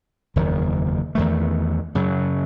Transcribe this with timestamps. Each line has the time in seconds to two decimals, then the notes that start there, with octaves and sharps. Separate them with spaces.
0.36 F#1 E2 D#3
1.15 E2 D#3 A3
1.95 F#2 C#3 F#3